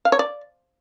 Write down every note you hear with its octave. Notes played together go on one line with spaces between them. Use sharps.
F5
C#5
D5